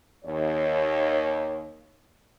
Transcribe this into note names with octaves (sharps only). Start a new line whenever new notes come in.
D#2 C#5